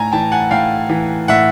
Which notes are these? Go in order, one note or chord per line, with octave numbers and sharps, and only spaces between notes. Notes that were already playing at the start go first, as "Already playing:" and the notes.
Already playing: A2 G#5 A#5
E3 G5 A5
F#5 G#5
A2 F5 G5
E3
A2 E5 F#5